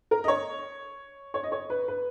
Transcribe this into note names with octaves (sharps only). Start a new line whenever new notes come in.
A#4
D#5
C#5
C#5
D#5
C#5
B4
B4